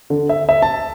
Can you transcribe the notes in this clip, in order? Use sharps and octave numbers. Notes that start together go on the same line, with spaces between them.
D3
E5
E5
A5